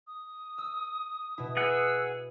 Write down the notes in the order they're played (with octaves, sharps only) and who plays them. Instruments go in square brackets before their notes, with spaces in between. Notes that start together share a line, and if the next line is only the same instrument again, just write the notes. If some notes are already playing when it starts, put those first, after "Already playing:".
[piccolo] D#6
[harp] E6
B2 E4
[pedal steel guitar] G#4 F#5 [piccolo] E6